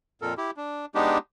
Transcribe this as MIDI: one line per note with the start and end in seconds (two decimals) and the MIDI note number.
0.22 0.34 41
0.22 0.34 46
0.22 0.34 69
0.22 0.34 70
0.38 0.51 64
0.38 0.51 67
0.57 0.86 62
0.95 1.18 56
0.95 1.18 59
0.95 1.18 62
0.95 1.18 63
0.95 1.18 67